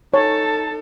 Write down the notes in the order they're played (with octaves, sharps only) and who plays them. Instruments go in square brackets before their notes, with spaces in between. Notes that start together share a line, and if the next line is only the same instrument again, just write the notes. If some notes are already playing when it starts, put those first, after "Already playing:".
[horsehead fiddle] D#4 A4 [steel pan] C#5 [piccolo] A5